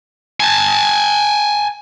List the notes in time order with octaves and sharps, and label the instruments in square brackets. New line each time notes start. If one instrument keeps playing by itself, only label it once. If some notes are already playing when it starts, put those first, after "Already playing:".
[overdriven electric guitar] G#5 A5